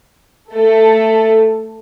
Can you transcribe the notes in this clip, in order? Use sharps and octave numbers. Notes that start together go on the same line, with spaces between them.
A3 A4